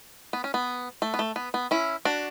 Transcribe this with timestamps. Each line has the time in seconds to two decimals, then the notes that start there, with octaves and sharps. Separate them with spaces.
0.33 B3
0.44 C#4
0.54 B3
1.02 A3
1.14 B3
1.19 A3
1.36 B3
1.54 B3
1.71 C#4 E4
2.05 D4 F#4